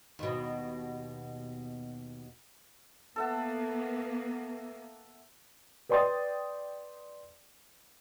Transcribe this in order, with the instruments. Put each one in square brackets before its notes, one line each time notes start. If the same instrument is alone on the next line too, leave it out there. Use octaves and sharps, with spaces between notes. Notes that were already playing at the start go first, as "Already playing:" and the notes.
[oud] D#2 B2
[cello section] A#3 B3 [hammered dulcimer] A4 E5 F#5
[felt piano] B4 D5 G5 C6 D#6 A6